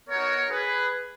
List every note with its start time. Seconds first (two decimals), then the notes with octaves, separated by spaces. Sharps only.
0.09 B3 D#4 F#4 A#4 C#5
0.51 G#4 B4